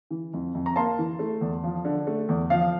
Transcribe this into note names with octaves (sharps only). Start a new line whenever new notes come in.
E3
F2
F2
A#5
A#3 A5 C6
E3
A3
E2
F3
D3
A3
E2
F3 F5